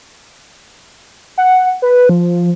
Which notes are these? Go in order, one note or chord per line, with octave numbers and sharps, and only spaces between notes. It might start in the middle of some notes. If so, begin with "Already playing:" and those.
F#5
B4
F3